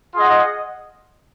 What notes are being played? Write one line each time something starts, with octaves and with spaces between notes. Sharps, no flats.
F4 G#4 D#5 F#5